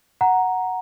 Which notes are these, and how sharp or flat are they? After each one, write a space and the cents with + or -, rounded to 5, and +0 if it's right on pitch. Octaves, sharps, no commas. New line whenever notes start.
F#5 +0 A#5 +0